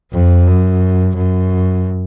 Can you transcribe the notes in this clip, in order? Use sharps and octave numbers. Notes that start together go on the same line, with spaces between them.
F2
F#2
F#2